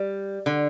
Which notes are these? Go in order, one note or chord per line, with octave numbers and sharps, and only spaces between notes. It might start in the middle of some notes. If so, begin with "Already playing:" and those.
Already playing: G3
D3